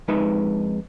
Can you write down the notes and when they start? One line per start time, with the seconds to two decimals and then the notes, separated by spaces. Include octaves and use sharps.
0.08 F2 G#3 D#4 B4 E5